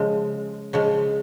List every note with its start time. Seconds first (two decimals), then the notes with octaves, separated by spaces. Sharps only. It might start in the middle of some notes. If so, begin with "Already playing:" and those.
Already playing: C#3 F3 G#3
0.73 C#3 F3 G#3